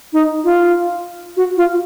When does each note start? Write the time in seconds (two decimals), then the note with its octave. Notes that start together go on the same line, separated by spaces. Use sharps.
0.13 D#4
0.44 F4
1.37 F#4
1.57 F4